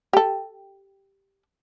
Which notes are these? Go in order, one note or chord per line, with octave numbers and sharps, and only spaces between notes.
G4 A4